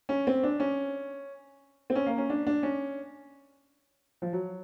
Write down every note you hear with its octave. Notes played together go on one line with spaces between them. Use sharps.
C#4
C4
D4
C#4
C4
C#4
A#3
C#4
D4
D4
C#4
F3
F#3